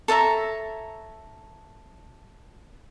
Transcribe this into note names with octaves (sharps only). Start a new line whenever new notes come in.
A4 C#5 E5 A#5